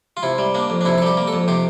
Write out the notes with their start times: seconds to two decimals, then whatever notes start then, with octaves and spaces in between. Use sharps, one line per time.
0.17 F4
0.23 C3 E4
0.38 G3
0.54 A#3 D4
0.70 F2
0.81 D4
0.85 C3 E4
0.98 A4
1.02 G3 G4
1.17 A#3
1.27 A4
1.33 F2
1.48 C3 G4